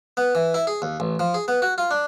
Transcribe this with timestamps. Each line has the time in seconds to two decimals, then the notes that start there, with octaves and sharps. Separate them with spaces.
0.17 B3
0.35 E3
0.54 E4
0.67 G#4
0.82 D#2
1.00 A1
1.19 F3
1.34 G#4
1.48 B3
1.62 F#4
1.78 F4
1.91 D4